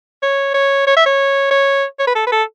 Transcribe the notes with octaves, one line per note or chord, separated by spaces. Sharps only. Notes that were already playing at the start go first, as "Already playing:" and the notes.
C#5
C#5
C#5
E5
C#5
C#5
C#5
B4
A4
B4
A4